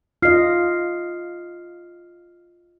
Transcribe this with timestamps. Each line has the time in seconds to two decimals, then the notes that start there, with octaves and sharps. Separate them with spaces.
0.22 F4 D#5 F6 C7